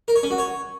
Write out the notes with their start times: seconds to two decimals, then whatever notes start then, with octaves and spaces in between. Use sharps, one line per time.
0.08 A#4
0.16 C#5
0.23 C#4
0.31 F#4
0.38 C#5